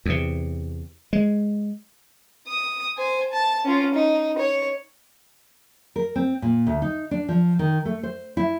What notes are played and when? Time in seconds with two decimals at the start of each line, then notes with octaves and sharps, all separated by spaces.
0.06 E2 C3
1.13 G#3
2.48 D#6
2.98 C5 G#5
3.33 A5
3.65 C#4 F4
3.94 D#4
4.38 C#5
5.96 A#4
6.16 C4
6.42 A#2
6.67 D2
6.82 D#4
7.11 D4
7.29 F3
7.59 D#3
7.85 A3
8.03 C5
8.37 E4